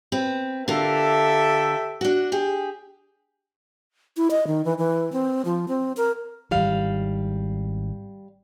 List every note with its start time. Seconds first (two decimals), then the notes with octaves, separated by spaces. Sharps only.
0.12 C4 B4
0.68 D3 F4 G4 A4 A#4 E5
2.01 D4 F#4
2.32 G4 G#4
4.17 E4
4.31 D#5
4.47 D#3
4.65 E3
4.78 E3
5.12 C4
5.45 F3
5.68 C4
5.97 A#4
6.51 G#1 E3 G3 F5